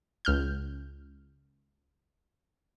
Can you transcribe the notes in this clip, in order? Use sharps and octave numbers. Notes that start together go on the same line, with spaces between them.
C#2 F6 G6